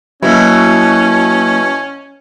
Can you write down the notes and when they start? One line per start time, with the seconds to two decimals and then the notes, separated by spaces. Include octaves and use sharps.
0.23 B2 F#3 A#3 C#4 E4